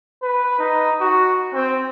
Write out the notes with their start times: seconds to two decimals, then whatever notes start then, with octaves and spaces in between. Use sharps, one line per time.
0.22 B4
0.59 D#4
1.01 F#4
1.54 C4